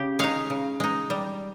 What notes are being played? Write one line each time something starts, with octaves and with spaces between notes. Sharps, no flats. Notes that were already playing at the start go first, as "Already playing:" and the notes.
Already playing: C#3 C#4 G4
G#3 D#4 C#5 F5
C#3
G#3 D#4
G3